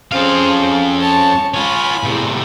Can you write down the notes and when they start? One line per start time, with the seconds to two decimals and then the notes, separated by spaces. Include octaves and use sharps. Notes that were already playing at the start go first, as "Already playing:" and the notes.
0.12 F2 C4 C#4 G#4 F5
1.00 C#5 A5
1.54 F4 C#5 G#5 B5
2.03 E2 A2 C3